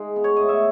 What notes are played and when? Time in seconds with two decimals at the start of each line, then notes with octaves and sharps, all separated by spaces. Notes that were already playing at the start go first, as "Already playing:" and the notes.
Already playing: G#3 D#4
0.16 B3
0.24 C#5
0.36 A2 D#5
0.49 E5